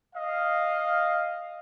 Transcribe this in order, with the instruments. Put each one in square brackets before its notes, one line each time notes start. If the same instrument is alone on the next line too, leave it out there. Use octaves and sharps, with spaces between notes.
[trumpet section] D#5 F5